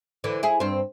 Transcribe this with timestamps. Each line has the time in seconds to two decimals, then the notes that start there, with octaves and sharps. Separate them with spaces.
0.24 D3 E3
0.43 E4 G#4
0.60 G2 C4